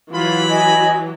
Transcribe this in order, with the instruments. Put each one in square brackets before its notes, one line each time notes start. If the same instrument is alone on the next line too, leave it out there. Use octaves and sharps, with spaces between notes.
[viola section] E3 F#3 G4 [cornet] F4 [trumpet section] A5 B5
[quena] D#5 [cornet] G#5